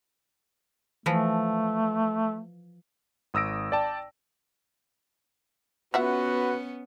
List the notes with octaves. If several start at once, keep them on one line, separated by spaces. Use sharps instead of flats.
E3 F3 A3
G#1 D#6 E6 A#6 D7
D5 G5 A5
B3 C#4 F4 F#4 B4 E5 F#5